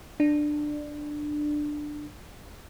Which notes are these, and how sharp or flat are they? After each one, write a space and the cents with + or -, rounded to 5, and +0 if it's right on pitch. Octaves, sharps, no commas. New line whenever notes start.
D4 +15